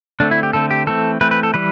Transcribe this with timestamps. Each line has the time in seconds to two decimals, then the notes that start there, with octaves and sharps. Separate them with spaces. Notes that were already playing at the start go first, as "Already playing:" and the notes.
0.20 D3 A3 C4 D4
0.31 E4
0.43 G4
0.53 D3 A3 C4 A4
0.71 G4
0.87 E3 A3 C4 A4
1.21 E3 A3 C4 B4
1.31 B4
1.43 A4
1.54 E3 G3 B4